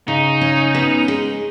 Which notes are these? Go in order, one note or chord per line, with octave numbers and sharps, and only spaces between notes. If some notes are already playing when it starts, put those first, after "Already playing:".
C#3 D#4
C#4
B3
G#3